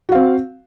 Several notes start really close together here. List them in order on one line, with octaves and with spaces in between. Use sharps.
F#4 F5 C4